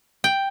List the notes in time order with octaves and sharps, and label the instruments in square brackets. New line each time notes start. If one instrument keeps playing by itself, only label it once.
[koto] G5